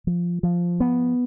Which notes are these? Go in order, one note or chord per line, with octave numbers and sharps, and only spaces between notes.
F3
F3
B3